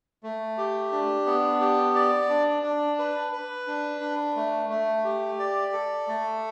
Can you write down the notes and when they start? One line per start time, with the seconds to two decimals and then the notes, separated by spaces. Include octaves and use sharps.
0.23 A3
0.58 G4
0.92 D4
1.26 B3
1.61 G4
1.95 D5
2.29 D4
2.63 D4
2.99 B4
3.32 B4
3.67 D4
4.01 D4
4.36 A3
4.69 A3
5.04 G4
5.39 D5
5.73 A4
6.07 A3